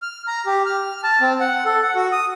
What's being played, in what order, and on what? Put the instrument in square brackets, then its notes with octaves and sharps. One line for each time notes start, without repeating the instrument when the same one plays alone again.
[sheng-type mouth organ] F6
A#5
G4
F6
A5
C4
F#5
A4
F#5
F#4
D#6